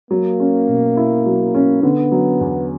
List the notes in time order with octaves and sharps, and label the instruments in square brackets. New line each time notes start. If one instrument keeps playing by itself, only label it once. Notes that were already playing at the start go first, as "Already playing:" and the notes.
[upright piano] F#3 [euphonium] A#3
[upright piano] C#4
B2
E4
F#3
C#4
[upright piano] D3 [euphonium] B3
[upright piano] F#3
E2